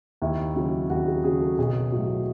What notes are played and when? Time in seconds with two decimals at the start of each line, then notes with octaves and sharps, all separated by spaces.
0.22 D#2 E4
0.56 C#3 F#3
0.90 D#2 F#4
1.06 G#4
1.24 C#3 F#3 G#4
1.42 A4
1.58 B1 G#4
1.92 A2 F#3